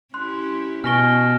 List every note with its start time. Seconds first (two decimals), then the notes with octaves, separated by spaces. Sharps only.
0.14 C#4 E4 G4 C6 F#6
0.84 B2 G#5 C#6 F6 A#6 D7 G7